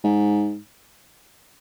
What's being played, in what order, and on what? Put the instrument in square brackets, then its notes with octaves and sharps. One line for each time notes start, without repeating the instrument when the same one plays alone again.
[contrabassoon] G#2